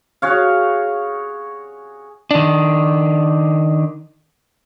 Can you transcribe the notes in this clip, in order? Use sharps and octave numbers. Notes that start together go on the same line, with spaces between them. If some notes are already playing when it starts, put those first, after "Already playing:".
F#4 G#4 C#5 F5
D#3 D4